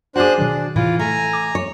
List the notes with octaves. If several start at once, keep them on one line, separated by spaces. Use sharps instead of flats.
D4 F#4 G#4 C5 F#5 D6 F#6
B2 D#3 F#3 D4
A2 C3 E3 F4
A3 G#5 A#5
D6
C#5